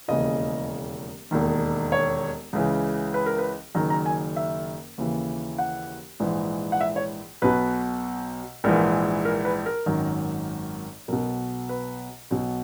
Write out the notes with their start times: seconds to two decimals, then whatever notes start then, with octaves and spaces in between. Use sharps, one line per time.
0.08 E1 D#2 C#3 E3 D#5
1.31 E1 D#2 D#3
1.92 C#5
2.53 C#2 C#3 E3
3.14 B4
3.26 A#4
3.39 B4
3.75 F#1 F#2 D#3 A#5
3.90 A#5
4.06 G#5
4.36 E5
4.98 D#2 C#3 E3
5.58 F#5
6.20 A#1 G#2 E3
6.72 F#5
6.81 E5
6.96 C#5
7.42 B1 B2 B4
8.64 A#1 G#2 E3 A#4
9.25 A#4
9.45 B4
9.66 A#4
9.86 G#1 F#2 D#3
11.08 B1 B2 A#4
11.69 B4
12.31 B1 B2